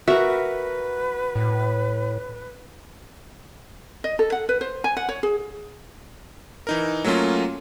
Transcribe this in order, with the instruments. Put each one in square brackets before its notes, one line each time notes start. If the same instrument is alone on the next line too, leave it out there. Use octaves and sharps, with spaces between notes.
[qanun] F#4 A#4 [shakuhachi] B4 [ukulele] E5
[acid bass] A2
[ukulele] D#5
A4
F#5
B4
C5
G#5
F#5
C#5
G#4
[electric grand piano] E3 D#4 A#4
F#3 A3 A#3 C#4 F4